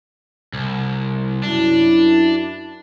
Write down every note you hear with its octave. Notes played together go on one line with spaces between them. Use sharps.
C2
F#2 D4 E4